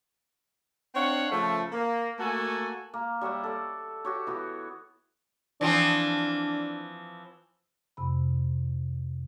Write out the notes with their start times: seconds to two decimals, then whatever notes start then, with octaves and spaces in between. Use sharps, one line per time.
0.95 C4 D4 C#5 F5 F#5
1.31 C#3 F3 A3
1.72 A#3
2.18 A3 A#3 F#4 A4 G#5
2.93 A#3
3.21 G3 C#5 E5 F#5
3.43 A4 D5
4.05 F#4 G4 C#5
4.27 E3 B3 F#4
5.61 E3 F3 C4 D4
7.97 F2 C3 B5